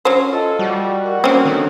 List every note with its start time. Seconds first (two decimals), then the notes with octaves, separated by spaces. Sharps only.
0.05 F#3 C#4 C5
0.31 F4 A4 D#5 F5
0.59 G3 F#4
1.04 F#4 A#4 F5
1.24 A#3 C4 C#4
1.45 D#3 D4 A4 C#5